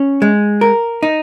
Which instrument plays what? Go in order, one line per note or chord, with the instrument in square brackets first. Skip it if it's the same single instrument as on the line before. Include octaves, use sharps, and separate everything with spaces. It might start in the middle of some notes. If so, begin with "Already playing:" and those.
Already playing: [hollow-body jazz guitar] C#4
G#3
A#4
D#4